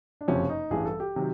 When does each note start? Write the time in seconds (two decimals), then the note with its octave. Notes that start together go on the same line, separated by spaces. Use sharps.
0.21 D4
0.28 F#1 F2 C3 F3 C#4
0.49 D#4
0.70 A1 G2 E3 G3 G#4
0.85 A4
1.00 G4
1.16 C3 D#3 F#3